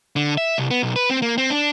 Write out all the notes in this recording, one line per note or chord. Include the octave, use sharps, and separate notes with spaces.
D3
E5
C2
B3
B1
B4
C4
A#3
C4
D4